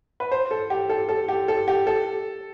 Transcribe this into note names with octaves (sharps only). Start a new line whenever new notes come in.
B4
C5
A4
G4
A4
A4
G4
A4
G4
A4